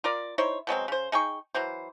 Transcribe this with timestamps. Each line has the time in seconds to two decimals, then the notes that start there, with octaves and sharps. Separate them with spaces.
0.04 F4 A#4 D5
0.38 D#4 E4 C5 C#5
0.67 B2 F#3 G#3 C4
0.88 C#3 C5
1.12 D#4 G#4 G5 C#6
1.55 E3 F#3 C5